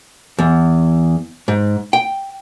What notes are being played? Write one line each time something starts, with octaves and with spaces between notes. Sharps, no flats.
E2
G#2
G5